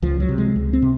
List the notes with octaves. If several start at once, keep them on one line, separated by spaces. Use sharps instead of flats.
C#2 F3
F#3
C3
G#3
C#2
C4
C3